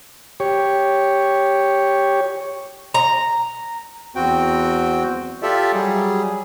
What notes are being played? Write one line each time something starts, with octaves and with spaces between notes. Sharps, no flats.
G4 C#5
A#5
E2 C4 F#4 G5
F4 G4 A4 D5 E5
F#3 G3 G#4